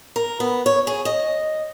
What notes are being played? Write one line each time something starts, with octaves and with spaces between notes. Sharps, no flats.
A#4
B3
C#5
G#4
D#5